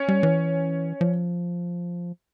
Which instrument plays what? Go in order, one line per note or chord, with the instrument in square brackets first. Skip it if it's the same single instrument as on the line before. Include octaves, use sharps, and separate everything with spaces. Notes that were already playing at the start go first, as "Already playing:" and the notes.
Already playing: [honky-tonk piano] C#4
[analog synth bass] G3
E3
F3